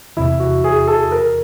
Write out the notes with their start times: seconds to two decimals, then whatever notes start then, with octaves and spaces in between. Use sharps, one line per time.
0.17 E2 C3 E3 E4
0.40 F#4
0.64 G#4
0.88 A4
1.12 A#4